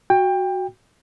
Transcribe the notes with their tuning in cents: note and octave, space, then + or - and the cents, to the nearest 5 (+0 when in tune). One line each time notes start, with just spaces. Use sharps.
F#4 +0 G5 +20